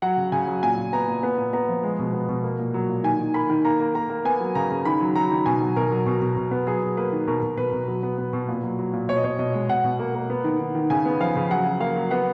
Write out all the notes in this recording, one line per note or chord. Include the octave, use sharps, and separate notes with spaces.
F#3 F#5
C#3
C#3 G#5
F#3
A#2 G#5
A#2
B3 A#5
A#2
B3
A#2
B3 A#5
F3
G#3
B2
B3
B2
A#3
A#2
F#3
A#2
D#3 G#5
D#3
A#3 B5
D#3
A#3 A#5
A#3
A#3 A#5
A#3
B3 G#5
F#3
C#3 A#5
C#3
D#3 B5
F#3
F#3 A#5
D#3
B2 G#5
F#3
B2 A#4
F#3
B2
B2
B2
B3
F#3 G#4
F#3
A#3 B4
D#3
B2 A#4
B2
B2 B4
B2
F#3
B3
B3
B2
A#2
F#3
F#3
A#2
B2 C#5
D#5
B2 C#5
B2 D#5
G#3
B2 F#5
B2
A#3
A#3
B3
D#3
D#3
D#3
C#3 G#5
B3
F3 F5
C#3
F#3 F#5
F#3
A#3 F5
F#3
B3 F#5